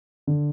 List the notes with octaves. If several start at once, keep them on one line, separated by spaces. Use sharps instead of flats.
D3